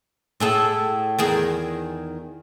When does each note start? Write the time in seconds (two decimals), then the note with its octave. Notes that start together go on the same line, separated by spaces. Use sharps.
0.40 A2 G#4 A4
1.18 E2 D#3 G#4